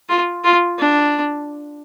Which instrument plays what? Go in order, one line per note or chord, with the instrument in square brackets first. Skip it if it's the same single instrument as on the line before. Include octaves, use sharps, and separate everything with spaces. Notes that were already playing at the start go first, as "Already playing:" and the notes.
[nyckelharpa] F4
F4
D4